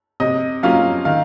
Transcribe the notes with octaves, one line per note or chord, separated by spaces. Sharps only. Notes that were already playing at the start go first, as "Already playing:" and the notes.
C3 D#5
F#3 A#3 C#4 F4 F5
D#3 F5